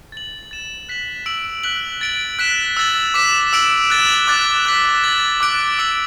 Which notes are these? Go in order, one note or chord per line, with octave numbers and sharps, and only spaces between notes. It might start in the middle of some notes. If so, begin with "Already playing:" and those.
A6 F#7
A6 E7
F#6 B6 F#7
E6 D7 F#7
F#6 B6 F#7
A6 D7 F#7
F#6 B6 E7
E6 A6 F#7
D6 B6 E7
E6 D7 F#7
F#6 A6 E7
D6 F#6 A6
D6 F#6 B6 F#7
A6 F#7
D6 F#6 D7 F#7
E6 D7 F#7